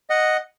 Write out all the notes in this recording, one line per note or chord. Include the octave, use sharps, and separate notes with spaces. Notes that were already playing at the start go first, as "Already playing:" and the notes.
D#5 F#5